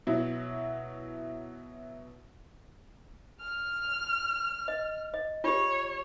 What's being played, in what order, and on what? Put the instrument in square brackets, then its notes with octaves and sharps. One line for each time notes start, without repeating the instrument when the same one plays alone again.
[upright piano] B2 F#3 E4
[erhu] F6
[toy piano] D#5
D#5
[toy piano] F4 G4 [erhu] C#5